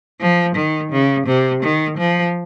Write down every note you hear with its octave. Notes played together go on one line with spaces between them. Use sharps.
F3
D#3
C#3
C3
D#3
F3